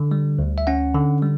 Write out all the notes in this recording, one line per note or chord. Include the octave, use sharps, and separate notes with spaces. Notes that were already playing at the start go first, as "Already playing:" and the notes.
Already playing: D3
G3
D2
E5
C#4 F#5
D3
G3